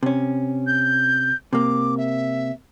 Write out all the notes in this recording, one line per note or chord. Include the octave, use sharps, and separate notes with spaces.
C3 C#4
G6
C3 A#3 D6
E5